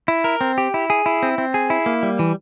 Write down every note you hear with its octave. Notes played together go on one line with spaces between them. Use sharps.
E4
A#4
C4
G4
E4
G#4
E4
C4
C4
G#4
E4
A#3
G3
E3